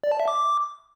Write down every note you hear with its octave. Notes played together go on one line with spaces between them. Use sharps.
D5
A5
E5
D6